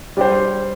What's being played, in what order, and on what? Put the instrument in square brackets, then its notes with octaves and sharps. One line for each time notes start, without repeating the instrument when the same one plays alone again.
[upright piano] G3 D4 G4 C5